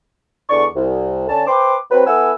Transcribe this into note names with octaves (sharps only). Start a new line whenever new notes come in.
E2 D3 D4 D5 C#6
C2
D3 C#4 A5
B4 C5 G5 C6 D6
F#3 C4 B4
B3 E4 A4 F#5 G#5 E6